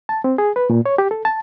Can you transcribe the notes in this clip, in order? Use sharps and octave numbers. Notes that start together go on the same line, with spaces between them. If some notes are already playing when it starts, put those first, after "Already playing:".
A5
C4
G#4
B4
A#2
C#5
G4
A4
A5